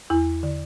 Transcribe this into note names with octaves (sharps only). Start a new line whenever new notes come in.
E2 E4
D3